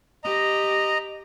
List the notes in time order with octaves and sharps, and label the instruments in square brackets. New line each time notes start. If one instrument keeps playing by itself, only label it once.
[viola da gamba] G4 [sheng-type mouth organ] D#5 A#5